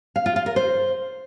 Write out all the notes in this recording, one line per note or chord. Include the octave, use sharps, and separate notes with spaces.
F5
F4
F4
A#4
C5